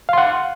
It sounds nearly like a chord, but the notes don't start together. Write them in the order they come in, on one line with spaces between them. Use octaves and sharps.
F5 C6 F#5